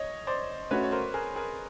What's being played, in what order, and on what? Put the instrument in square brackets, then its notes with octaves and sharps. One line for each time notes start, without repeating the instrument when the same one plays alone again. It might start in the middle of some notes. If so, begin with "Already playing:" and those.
Already playing: [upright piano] C#5 D#5
C5 D5
[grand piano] A3 C#4 F#4 [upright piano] B4 C#5
[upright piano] C#5
A#4 C5
G#4 A#4
G#4 A#4